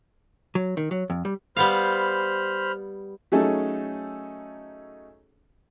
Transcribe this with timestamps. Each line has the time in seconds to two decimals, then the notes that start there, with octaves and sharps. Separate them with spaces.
0.55 F#3
0.77 D#3
0.91 F#3
1.10 F2
1.25 G3
1.57 G3 B3 C5 F5 B5 F6
3.32 F#3 A3 C#4 D#4 G#4 A4